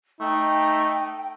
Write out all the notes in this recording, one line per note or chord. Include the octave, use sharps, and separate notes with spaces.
A3 D#4 G5